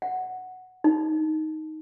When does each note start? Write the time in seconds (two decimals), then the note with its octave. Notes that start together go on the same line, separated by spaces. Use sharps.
0.02 F#5
0.84 D#4